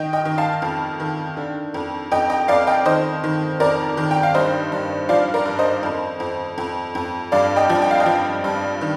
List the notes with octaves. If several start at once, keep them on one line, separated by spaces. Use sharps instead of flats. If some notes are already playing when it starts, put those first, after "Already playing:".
Already playing: D#3 D#5 G5
D#5 G5
D#3
F5 A5
F2
D#3
D3
F2
F2 D#5 G5
D#5 G5
F2 D5 F5
D#5 G5
D#3 C5 D#5
D#3
F2 A#4 D5
D#3
G5
F5
G2 C5 D#5
G2
F3 D5 F5
A#4 D5
G2
C5 D#5
F2
F2
F2
F2
G2 D5 F5
D#5 G5
F3
G5
F5
D#5 G5
F3
G2
D#3